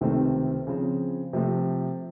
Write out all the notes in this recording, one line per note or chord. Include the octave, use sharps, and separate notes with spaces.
C#2 C3 D#3 A3 C4
C#3 F3 C4
C3 F3 A3 C4